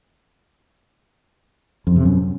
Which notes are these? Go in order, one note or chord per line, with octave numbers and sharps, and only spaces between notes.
F2
C3
F#2